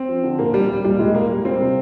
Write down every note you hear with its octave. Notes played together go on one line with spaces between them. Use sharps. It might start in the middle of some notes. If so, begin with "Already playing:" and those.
Already playing: C4
F3
D3
A#2 A#3
G3
G3
A#2 G3
A#2 G#3
G3 A#3
G3
A#2 C4
C3